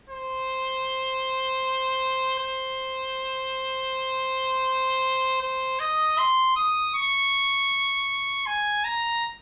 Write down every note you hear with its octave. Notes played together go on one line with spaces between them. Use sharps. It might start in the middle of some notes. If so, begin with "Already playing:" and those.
C5
C5
C5
D#5
C6
D#6
C#6
G#5
A#5